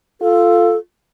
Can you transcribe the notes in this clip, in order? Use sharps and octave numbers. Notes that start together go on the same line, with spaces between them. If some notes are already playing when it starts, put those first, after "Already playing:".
F4 A4